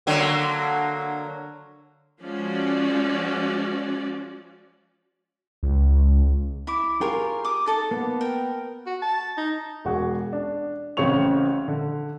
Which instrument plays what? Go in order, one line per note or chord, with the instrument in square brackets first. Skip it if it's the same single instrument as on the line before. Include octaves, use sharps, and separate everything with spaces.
[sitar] D3 F#3 A#3
[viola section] F3 G#3 C#4 F#4 D5
[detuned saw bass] C#2
[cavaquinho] E4 D6
[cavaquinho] F4 A#4 C#5 [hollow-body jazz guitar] G4 G#4
[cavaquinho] D6 D#6
D#4 A4 A5
[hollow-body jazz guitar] A#3 B3
[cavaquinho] A#4 G5
[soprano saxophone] F#4
A5
D#4
[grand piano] E1 F#4 G#4
D4
A1 C#3 C4 C#5 C#6 F7
D3